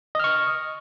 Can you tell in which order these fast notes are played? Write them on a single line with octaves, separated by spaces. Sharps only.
D#5 F6 C#6